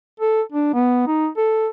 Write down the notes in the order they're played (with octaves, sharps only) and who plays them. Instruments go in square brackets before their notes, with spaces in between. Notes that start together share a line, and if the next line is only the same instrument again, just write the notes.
[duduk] A4
D4
B3
D#4
A4